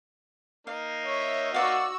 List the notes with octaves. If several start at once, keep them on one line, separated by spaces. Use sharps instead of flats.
A#3 D#4 F5
C#5 E5
F#4 C#5 D5 F5 F#5 E6